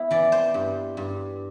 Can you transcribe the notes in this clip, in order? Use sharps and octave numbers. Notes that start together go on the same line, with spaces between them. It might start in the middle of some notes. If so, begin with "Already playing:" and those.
Already playing: B3 E4
E3 D5
C5
G2
G2